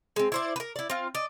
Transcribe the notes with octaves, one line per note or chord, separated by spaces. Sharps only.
G#3 C4
E4 C5 D5
A#4 B4
E4 D5
C4 F4
D5 D#5